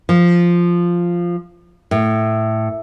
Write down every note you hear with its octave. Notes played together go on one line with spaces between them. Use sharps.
F3
A2